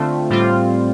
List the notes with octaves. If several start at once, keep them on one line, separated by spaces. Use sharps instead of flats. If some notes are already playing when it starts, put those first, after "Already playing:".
Already playing: D3 A3 C4 F4
A2 G3 C4 F4